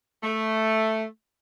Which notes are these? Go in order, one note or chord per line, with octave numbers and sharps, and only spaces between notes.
A3